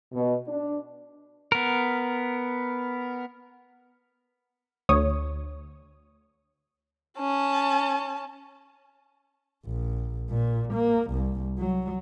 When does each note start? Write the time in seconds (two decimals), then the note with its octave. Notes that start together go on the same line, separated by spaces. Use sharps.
0.13 B2
0.47 D4
1.52 B3 A#4
4.89 D2 C#5 D#6
7.19 C#4 A5
9.66 A#1
10.30 A#2
10.74 A#3
11.11 C2
11.59 F#3